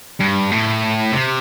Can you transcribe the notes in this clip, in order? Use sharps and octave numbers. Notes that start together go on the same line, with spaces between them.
G2
A2
C3